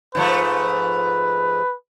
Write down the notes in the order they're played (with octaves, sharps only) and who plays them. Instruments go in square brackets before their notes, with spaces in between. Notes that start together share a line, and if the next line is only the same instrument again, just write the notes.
[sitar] G#2 F3 A3 [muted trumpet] B4